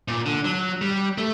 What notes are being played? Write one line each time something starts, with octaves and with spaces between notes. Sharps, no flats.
A#2
D3
F#3
G3
A3